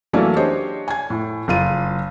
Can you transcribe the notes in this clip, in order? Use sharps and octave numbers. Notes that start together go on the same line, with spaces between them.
E3 F#3 A3 A#3 C#4 D5
D4 G4 G#4 C5 C#5 D#5
G#5 G#6
A2
F#1 F4 D#7